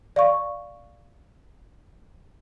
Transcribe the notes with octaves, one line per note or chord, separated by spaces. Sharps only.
D5 F5 C#6